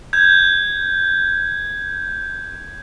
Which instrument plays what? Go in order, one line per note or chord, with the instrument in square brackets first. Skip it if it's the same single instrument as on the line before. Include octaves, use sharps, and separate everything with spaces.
[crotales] G6 G#6